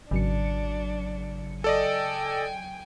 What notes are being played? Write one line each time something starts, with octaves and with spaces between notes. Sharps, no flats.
G#1 C#3 F#3 D4 C#7
A4 D5 D#5 G5 G#5